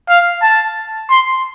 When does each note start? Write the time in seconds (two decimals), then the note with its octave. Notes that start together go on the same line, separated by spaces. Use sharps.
0.09 F5
0.42 A5
1.10 C6